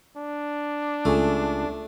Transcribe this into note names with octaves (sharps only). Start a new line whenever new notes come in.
D4
C#2 A3 G#4